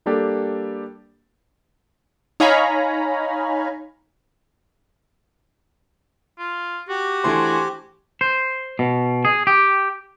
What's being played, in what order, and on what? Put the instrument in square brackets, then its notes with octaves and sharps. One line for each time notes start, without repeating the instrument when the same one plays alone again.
[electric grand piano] G3 A#3 D4 G4 A4
[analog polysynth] D#4 C#5 F5 G#5 A#5 B5
[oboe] F4
[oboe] F#4 [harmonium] G4
[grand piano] E3 A3 C6 [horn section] D4 C5 G#5
[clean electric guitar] C5
B2
G#4
G4